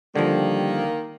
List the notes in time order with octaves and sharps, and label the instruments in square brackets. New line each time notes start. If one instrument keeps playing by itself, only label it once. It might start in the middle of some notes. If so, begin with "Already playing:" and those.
[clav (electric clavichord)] D3 F3 [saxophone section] D#3 A#3 [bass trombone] G3